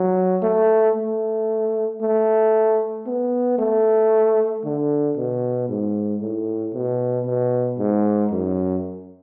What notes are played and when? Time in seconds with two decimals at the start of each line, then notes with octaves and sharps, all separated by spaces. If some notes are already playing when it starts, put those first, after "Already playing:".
Already playing: F#3
0.43 A3
0.95 A3
2.01 A3
3.06 B3
3.59 A3
4.64 D3
5.17 B2
5.69 G#2
6.21 A2
6.74 B2
7.26 B2
7.79 G#2
8.31 F#2